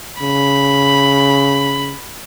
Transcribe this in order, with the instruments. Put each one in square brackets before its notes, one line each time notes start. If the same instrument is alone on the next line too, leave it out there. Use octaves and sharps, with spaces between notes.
[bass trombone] C#3 [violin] B5